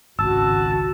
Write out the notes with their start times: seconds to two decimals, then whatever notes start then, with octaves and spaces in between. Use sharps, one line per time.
0.19 G#1 C#2 F#4 A5 E6